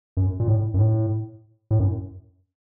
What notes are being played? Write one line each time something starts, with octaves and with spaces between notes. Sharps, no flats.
F#2
A#2
A2
F#2
A2
A2
F#2